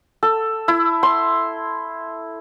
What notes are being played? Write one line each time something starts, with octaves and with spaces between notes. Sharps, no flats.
A4
E4
C6